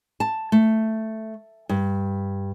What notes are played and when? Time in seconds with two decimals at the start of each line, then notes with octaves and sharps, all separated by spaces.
0.20 A5
0.52 A3
1.69 G2